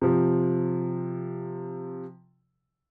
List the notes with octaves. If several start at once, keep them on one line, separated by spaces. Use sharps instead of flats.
C3 F3